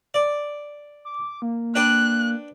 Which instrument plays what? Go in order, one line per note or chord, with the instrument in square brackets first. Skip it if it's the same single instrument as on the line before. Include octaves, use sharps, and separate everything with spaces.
[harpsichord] D5
[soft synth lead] D6
A#3
[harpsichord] D4 B4 G5 [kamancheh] F#6